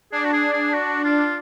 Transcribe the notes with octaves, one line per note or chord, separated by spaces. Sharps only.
D4 G#4
F#4
G#4
G#4
F#4
F4